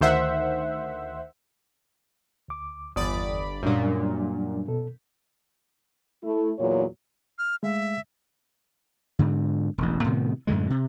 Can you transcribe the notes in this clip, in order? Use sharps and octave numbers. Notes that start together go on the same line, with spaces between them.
D2 D#3 C5 E5 F#5
D2 D6
G1 E2 D5 B5 D#6
F#2 A#2 F#3 G3 D4
B2 A4
A3 E4
E2 A#2 F#3 C#5
F6
G#3 A3 E5 F5
G#2 D3
E1 A1
A2 C3 D#3 B3
F#2 A2 D3 G#3
C3